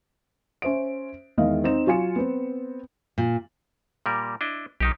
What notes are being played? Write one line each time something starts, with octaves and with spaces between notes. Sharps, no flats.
C#4 C5 E5 D7
E2 D#3 E3 G#3 D#5 F5
C4 D#4 E7
F#3 F4 G#5 C#7
B3 C4
A#2
A#2 G3 A#4
D4 E4 D#5
B1 D#3 D#4 G4